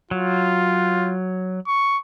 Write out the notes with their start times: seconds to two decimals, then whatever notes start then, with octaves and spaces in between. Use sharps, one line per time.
0.11 F#3 F4
1.67 C#6